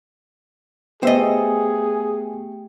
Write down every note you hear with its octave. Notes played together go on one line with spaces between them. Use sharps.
A3 B3 G4 G#4 C5 D#5 E5 G5